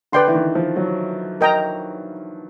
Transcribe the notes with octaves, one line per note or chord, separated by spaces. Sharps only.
D3 B4 D5 G5 C6
E3
D#3
F3
F#3
A#4 D#5 G5 A#5